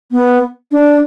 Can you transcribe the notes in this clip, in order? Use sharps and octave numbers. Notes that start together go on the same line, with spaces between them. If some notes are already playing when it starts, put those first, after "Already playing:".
B3
D4